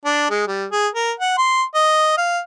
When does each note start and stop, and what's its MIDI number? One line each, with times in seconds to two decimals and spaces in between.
0.05 0.29 62
0.30 0.45 56
0.47 0.65 55
0.72 0.88 68
0.95 1.11 70
1.20 1.35 78
1.38 1.62 84
1.75 2.16 75
2.17 2.39 77